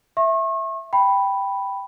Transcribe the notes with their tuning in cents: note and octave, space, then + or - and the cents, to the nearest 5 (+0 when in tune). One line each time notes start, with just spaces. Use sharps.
E5 +0 C#6 -40
G5 +0 B5 +0